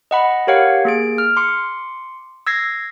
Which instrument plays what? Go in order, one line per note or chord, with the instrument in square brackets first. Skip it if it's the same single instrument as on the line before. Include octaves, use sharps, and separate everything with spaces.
[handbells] D#5 F#5 B5
G4 A#4 C#5 F5 F#5
A#3 G#4 D7
F6
C6 D6 C#7
E6 G#6 A#6 C7